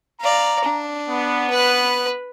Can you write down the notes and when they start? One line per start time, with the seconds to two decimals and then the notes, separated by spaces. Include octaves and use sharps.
0.21 D5 F5 A#5
0.65 D4
1.09 B3
1.50 B4 F#6